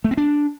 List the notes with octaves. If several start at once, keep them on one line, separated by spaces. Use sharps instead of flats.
A3
C4
D4